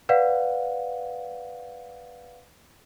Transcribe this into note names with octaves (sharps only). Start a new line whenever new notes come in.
B4 D5 F5 F#5